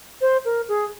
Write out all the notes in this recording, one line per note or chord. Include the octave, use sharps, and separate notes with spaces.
C5
A#4
G#4